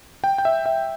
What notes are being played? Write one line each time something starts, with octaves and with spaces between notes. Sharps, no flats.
G5
G5
E5
E5